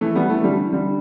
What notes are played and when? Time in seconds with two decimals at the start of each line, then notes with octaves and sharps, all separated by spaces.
0.01 E3 A3
0.15 G3 B3
0.30 E3 A3
0.44 D3 G3
0.59 E3
0.73 D3 G3